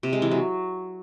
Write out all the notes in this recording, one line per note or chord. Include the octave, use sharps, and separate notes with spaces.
C3
G#3
E3
F#3